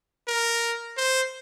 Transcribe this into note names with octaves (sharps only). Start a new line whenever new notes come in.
A#4
C5